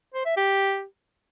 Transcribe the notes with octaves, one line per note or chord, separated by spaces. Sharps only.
C5
E5
G4